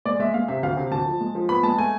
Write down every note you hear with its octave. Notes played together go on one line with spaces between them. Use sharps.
G#3 D5
G#3 E5
G#3 F5
C3 E5
D2 F5
C3
D2 A5
F3
G#3
F3
B3 B5
G#3 A5
A3 G#5